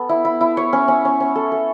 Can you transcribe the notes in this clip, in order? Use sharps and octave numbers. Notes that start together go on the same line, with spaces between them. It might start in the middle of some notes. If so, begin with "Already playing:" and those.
Already playing: B3 A4
E4
E4
E4
C#5
C#4
C#4
C#4
C#4
A4
A4